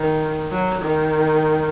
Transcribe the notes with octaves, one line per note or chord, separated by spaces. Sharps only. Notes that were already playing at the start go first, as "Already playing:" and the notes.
Already playing: D#3
F#3
D#3